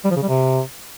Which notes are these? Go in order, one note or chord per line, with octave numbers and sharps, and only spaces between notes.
G3
F3
C#3
G3
C3